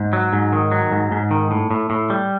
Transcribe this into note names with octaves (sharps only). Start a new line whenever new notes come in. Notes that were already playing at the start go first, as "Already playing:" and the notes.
Already playing: G#2
F#3
G#2
D#3
F#3
G#2
G#2
D#3
A2
A2
A2
G3